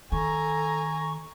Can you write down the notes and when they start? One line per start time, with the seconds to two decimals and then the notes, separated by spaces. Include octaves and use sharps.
0.12 D#3 A4 G#5 A#5 C#6